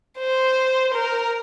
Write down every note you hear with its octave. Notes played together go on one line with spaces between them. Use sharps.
C5
A#4